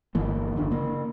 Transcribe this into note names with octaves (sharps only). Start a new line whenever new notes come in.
G1 E3 A#3
F#1 D3 D4
C#3 A#3